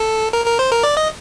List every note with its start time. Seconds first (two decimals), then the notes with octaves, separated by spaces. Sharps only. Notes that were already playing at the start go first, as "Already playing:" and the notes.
Already playing: A4
0.33 A#4
0.46 A#4
0.59 C5
0.72 A#4
0.84 D5
0.97 D#5